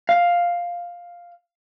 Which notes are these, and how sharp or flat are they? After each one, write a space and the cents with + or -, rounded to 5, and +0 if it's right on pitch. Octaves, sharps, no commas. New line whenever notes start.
F5 +5